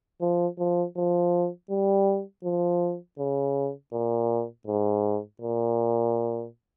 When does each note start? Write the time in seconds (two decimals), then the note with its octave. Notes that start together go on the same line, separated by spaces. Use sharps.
0.21 F3
0.59 F3
0.96 F3
1.70 G3
2.44 F3
3.19 C#3
3.93 A#2
4.67 G#2
5.42 A#2